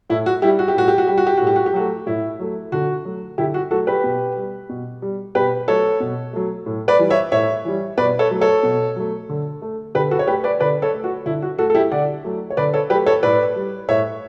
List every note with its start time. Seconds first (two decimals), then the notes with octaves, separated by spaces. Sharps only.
0.10 A2 E4
0.26 F#4
0.42 G3 E4 G4
0.59 F#4
0.68 G4
0.75 A2 F#4
0.88 G4
0.98 F#4
1.07 G3 G4
1.18 F#4
1.27 G4
1.37 A2 F#4
1.47 G4
1.56 F#4
1.66 G4
1.73 F#3 A3 F#4
2.06 A2 E4
2.39 F#3 A3
2.72 D3 F#4
3.05 F#3 A3
3.38 D3 E4 G4
3.54 F#4
3.71 F#3 A3 F#4 A4
3.87 G4 B4
4.04 B2
4.36 G3
4.69 B2
5.02 G3
5.35 B2 G4 B4
5.68 F#3 A3 A4 C#5
6.00 B2
6.33 F#3 A3
6.66 A2
6.88 B4 D5
6.99 E3 G3
7.10 C#5 E5
7.32 A2 C#5 E5
7.65 E3 G3
7.97 B2 B4 D5
8.19 A4 C#5
8.30 F#3 A3
8.41 A4 C#5
8.63 B2
8.96 F#3 A3
9.29 D3
9.62 A3
9.95 D3 G4 B4
10.11 F#4 A4
10.19 C#5
10.27 A3 G4 B4
10.44 B4 D5
10.60 D3 B4 D5
10.82 A4 C#5
10.94 A3
11.04 F#4
11.26 D3 E4
11.42 F#4
11.58 A3 F#4 A4
11.70 A4
11.75 E4 G4
11.92 D3 D5 F#5
12.24 F#3 A3
12.50 C#5
12.57 D3 B4 D5
12.74 A4 C#5
12.90 F#3 A3 G4 B4
13.06 A4 C#5
13.23 A2 B4 D5
13.56 G3
13.89 A2 C#5 E5